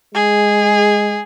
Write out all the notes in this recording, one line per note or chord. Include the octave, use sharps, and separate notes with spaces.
G#3 G#4